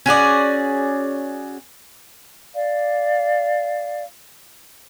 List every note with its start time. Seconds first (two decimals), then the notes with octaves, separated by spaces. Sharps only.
0.06 C#4 F#4 G#4 D5
2.53 D5 F5